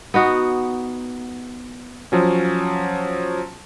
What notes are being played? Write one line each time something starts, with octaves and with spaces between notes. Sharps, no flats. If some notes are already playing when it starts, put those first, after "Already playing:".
B3 D#4 F#4
F3 F#3 C#4